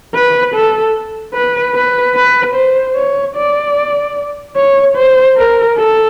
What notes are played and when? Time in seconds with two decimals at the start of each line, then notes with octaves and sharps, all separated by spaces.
0.15 B4
0.55 A4
1.34 B4
1.75 B4
2.15 B4
2.55 C5
2.96 C#5
3.36 D5
4.56 C#5
4.96 C5
5.37 A#4
5.77 A4